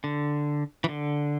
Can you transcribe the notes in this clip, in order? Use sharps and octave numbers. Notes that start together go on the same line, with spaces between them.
D3
E3
D3